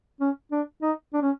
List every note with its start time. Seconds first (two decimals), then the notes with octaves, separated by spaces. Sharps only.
0.21 C#4
0.52 D4
0.82 D#4
1.14 D4
1.22 C#4